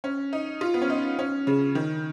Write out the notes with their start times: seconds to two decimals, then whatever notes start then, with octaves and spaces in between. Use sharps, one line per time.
0.04 C#4
0.33 D#4
0.61 F4
0.74 B3
0.82 C#4
0.90 D#4
1.19 C#4
1.47 C#3
1.75 D#3